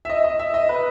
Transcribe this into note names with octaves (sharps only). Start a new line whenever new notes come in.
E5
D#5
D#5
E5
D#5
B4